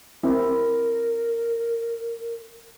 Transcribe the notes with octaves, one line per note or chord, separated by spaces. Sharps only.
C4 E4 A#4